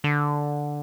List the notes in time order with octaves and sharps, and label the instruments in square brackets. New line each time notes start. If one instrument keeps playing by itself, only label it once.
[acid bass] D3